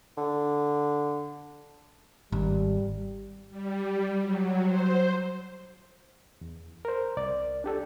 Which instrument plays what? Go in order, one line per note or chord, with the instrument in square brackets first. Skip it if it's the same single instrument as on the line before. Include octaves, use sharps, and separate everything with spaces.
[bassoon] D3
[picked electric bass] G#1 [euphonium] G3
[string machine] G3
F#3
C5
[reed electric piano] E2
A#4 C5
C2 D5
D4 G4 A4